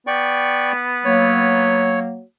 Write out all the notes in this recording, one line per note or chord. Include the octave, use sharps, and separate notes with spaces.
B3 D5 G5 C#6
F#3 A#3 C#5